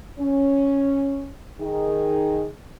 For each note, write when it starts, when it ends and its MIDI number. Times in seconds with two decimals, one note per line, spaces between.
0.19 1.29 61
1.60 2.47 51
1.60 2.47 63
1.60 2.47 68